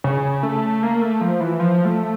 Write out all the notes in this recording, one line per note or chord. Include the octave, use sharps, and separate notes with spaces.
C#3
A3
A#3
A3
F3
E3
F3
A3